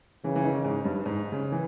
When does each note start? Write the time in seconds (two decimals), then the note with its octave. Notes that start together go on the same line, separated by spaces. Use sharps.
0.24 C#3 E3
0.36 E3
0.44 D#3
0.65 G#2
0.84 G2
1.06 G#2
1.32 C#3
1.52 E3